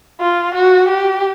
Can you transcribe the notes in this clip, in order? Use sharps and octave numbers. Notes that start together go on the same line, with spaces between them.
F4
F#4
G4